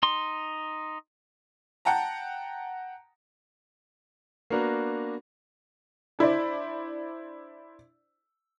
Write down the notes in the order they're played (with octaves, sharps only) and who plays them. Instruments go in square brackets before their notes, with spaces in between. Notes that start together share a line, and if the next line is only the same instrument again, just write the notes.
[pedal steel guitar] D#4 C6
[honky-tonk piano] F#5 G5 A5 A#5
[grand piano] A#3 B3 D4 F#4 A#4 B4
[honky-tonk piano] D4 E4 C5 D5